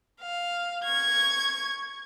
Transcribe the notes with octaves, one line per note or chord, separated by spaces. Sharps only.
F5
C#6 G#6